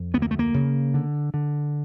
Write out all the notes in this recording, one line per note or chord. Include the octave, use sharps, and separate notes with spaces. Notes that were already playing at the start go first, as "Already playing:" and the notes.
Already playing: F2
D2 B3
A#3
A3
A#3
C#3
D3
D3